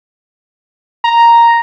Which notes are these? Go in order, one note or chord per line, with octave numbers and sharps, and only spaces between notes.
A#5